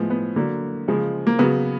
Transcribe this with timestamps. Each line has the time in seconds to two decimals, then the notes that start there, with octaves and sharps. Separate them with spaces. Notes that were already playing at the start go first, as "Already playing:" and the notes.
Already playing: A2 F3 G#3 B3
0.10 B3
0.36 D3 F#3 A#3
0.88 C#3 F3 G#3
1.27 A#3
1.39 C#3 F#3 B3